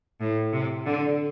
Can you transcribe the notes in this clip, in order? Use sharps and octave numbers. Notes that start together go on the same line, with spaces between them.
A2
C3
D3